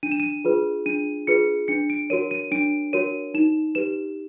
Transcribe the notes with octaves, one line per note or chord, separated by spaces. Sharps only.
D4 D#7
E7
D#7
F4 G#4 B4
D4 D#7
F4 G#4 B4 C#7
D4 C#7
D7
F#4 A#4 C#5 D#7
D#7
D4 D7
F#4 A#4 C#5 D#7
D#4 E7
G4 B4 E7